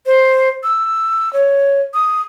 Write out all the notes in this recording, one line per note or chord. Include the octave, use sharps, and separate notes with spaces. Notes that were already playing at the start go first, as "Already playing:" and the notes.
C5
E6
C#5
D#6